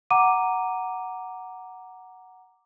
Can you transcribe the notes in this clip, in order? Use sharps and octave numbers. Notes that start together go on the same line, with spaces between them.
F#5 A#5 D6 D#7